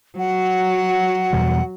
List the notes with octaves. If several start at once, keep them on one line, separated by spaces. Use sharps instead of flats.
F#3 F#5
E2 B2 G3